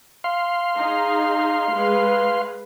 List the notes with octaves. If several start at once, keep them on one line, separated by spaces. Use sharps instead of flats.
F5 C6
D#4 G#4
G#3 B4